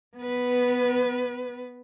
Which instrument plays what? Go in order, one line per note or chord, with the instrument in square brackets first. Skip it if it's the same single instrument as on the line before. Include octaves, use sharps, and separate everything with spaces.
[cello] B3 B4